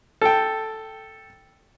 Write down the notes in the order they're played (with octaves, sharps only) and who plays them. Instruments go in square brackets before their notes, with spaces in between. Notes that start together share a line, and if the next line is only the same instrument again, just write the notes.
[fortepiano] A4 G5